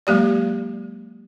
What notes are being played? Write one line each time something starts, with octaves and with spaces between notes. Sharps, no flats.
F#3 G#3 A#3 G4 D5